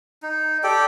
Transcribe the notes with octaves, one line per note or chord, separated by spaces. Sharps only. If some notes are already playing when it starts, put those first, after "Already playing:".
D#4
G4 A4 D5 G5